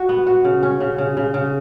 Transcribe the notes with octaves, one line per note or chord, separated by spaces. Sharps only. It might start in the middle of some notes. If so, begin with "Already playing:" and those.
Already playing: F#4
B3
F#4
C#3
C#4
C#3
C#3
C#3
C#3